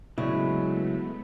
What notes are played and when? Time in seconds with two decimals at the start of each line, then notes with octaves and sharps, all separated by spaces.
0.18 C#3 F#3 G#3 A3 B3 E4